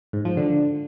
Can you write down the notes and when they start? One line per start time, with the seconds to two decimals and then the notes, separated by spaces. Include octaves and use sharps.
0.13 G#2
0.25 F3
0.37 D3